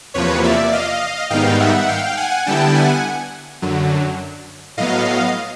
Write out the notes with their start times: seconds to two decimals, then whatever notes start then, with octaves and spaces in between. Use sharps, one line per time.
0.14 E2 C3 F3 A#3 B4 C#5
0.43 D5 E5
0.72 D#5 F5
1.30 G#2 D#3 G3 B3 D#4 F5 G5
1.60 E5 F#5
1.88 F5 G5
2.17 F#5 G#5
2.46 D3 G3 B3 E4 G5 A5
2.75 F#5 G#5
3.62 F#2 D3 F#3
4.77 A2 F#3 B3 D#5 F5